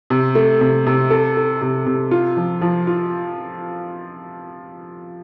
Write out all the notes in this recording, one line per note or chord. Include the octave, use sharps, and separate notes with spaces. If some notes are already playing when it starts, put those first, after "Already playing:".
C3
A3
C3
C3
A4
A4
C3
C3
F4
F3
F3
F4